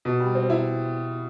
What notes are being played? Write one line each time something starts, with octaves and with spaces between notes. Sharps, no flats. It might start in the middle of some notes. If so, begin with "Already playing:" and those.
B2
G3
C4
E4